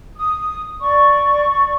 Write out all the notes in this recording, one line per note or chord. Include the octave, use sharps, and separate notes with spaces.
D#6
D5 C#6